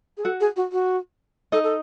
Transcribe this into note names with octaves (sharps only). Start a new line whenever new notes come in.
G#4
F#4 A4 F#5
G#4
F#4
F#4
D#4 A4 D#5
A4